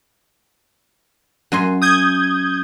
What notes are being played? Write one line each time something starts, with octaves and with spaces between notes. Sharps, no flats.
F#2 G#5 C6
D#6 G6 G#6